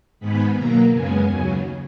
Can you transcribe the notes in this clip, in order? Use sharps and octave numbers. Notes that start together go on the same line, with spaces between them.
G#2 D#3 G#3 B3 B5
B2 F#3 A#3 A#5
F#2 C#3 G#3 B3 G#5
D#2 C#3 F#3